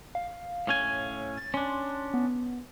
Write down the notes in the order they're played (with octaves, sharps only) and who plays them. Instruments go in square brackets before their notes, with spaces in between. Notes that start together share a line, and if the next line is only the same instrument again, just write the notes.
[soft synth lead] F5
[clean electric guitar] A2 C#4 G#5
[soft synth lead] A6
[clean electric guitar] C#4 D4 [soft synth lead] C6
[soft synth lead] B3